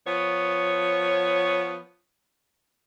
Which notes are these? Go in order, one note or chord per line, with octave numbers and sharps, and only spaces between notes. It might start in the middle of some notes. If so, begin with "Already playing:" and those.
F3 B3 C#5